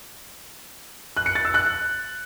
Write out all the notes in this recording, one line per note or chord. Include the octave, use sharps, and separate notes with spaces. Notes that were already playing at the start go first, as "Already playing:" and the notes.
F#6
C#7
A6
E6
F#6